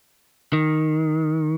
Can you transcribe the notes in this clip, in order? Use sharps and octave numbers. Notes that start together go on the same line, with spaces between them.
D#3